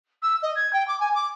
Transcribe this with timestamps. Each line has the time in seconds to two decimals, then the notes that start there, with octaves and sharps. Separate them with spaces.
0.22 E6
0.42 D#5
0.55 G#6
0.73 G5
0.87 D6
1.00 G#5
1.14 D6